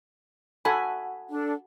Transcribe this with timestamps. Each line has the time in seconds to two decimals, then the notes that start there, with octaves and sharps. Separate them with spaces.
0.65 F#4 A4 G#5 B5
1.30 D4 A4